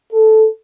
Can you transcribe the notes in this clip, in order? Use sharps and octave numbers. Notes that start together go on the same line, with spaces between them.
A4